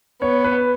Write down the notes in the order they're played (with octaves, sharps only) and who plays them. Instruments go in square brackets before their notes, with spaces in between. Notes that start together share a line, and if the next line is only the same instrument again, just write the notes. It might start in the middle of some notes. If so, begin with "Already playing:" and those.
[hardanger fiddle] B3 [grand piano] C#5
[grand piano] B4